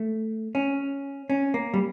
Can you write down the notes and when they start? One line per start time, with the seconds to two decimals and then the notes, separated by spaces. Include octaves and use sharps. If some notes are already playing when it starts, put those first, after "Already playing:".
Already playing: A3
0.55 C#4
1.30 C#4
1.54 A#3
1.74 G3